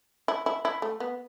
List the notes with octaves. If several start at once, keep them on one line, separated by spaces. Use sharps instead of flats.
E4
E4
E4
A3
B3